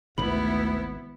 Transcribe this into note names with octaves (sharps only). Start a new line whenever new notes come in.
G#1 D2 G#2 C3 B3 E4 B5